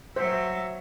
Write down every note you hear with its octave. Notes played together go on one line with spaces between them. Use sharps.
F#3 C5 E5